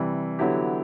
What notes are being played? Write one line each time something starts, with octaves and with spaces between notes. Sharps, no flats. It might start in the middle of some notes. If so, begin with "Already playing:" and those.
Already playing: C3 E3 G3
D3 F#3 B3 E4 G4